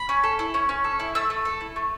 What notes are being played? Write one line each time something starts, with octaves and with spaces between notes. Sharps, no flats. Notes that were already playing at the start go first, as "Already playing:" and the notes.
Already playing: B5
C#4
A4
E4
C#4
C#4
A4
E4
A3 E6
A3
A4
E4
A3